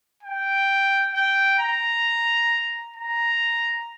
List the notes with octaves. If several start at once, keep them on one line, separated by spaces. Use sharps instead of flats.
G5
G5
A#5
A#5